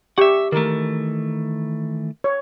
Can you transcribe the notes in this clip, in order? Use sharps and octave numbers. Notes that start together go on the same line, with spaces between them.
G4 E5 F#5 C#6
D#3 E3 A3 A#4
C#5